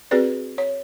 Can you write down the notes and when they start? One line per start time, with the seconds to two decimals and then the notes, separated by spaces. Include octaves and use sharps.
0.11 C4 F#4 G#4 B4 D5
0.58 C#5